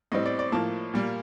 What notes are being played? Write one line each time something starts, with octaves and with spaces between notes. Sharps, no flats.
A2 G3 C4 D#5
D5
D5
A2 F3 A#3 A5
A#2 G3 A#3